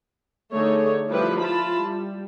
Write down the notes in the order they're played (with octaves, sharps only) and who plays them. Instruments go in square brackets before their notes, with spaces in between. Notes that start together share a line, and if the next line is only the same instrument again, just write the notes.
[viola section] D3 A3 D#4 G#4 C#5
F3 G3 E4 G4 B4
E4 F4 A5 B5
G3